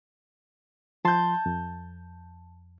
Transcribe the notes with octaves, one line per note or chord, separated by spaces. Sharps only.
F3 A5 C6 G6
F2